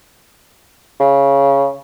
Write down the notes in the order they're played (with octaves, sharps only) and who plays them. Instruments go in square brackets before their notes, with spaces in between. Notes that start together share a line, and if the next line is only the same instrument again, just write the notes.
[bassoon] C#3